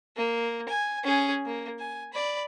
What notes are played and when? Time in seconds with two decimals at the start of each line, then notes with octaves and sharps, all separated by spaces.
0.17 A#3
0.68 G#5
1.04 C#4 G#4
1.46 A#3
1.79 G#5
2.13 D5 B5